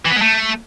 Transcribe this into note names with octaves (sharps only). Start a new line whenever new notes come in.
E3
B3
G#3
A3